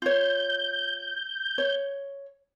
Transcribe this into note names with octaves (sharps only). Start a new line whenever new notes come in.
F4 C#5 G6
C#5